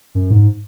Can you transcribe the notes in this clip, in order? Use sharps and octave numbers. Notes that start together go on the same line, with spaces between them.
F#2
G#2